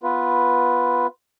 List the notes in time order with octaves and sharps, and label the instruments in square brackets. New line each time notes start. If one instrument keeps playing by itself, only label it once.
[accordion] B3 F4 B4